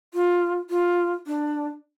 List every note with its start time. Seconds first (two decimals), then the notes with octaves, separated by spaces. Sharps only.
0.14 F4
0.70 F4
1.27 D4